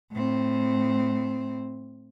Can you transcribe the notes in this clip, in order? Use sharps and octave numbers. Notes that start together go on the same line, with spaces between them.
A2 C4